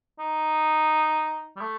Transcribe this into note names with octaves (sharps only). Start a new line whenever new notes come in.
D#4
G3
A3